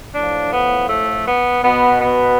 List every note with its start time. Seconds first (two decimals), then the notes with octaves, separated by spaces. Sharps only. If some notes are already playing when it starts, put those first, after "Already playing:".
0.15 A2 F3 D4
0.53 B3
0.89 A3
1.27 B3
1.64 B2 B3
2.01 B3